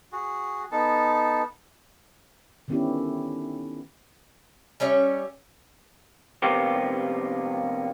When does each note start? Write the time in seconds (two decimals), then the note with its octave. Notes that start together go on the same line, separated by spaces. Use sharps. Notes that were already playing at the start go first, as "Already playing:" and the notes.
0.12 F#4 G#4
0.72 B3 D#4 A4 A5
2.68 D3 D#3 B3 C#4 E4 G4
4.80 G3 C#4 C#5 E5
6.42 D2 C3 F3 A#3 B3 G4